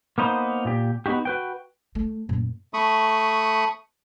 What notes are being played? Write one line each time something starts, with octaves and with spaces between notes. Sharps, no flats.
A#3 B3 D#4 C5
A#2 G4
B3 D#4 F#4 G4
F#4 B4 G5
A3
F#2 A#2
A3 B5 C#6 D#6